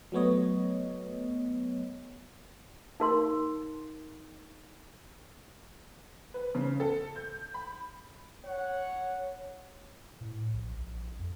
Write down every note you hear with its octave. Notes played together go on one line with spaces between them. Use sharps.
F#3 A3 B3 C#5 D#5
D#4 A#4 C6
B4
C#3
A4
G6
B5
C#5 F#5
A2
A#1
A#1
F2